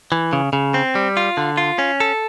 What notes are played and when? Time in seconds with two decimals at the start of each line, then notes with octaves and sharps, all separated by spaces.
0.12 E3
0.33 C#3
0.53 C#3
0.74 C4
0.95 G3
1.17 F4
1.37 D3
1.57 F4
1.79 C#4
2.00 A4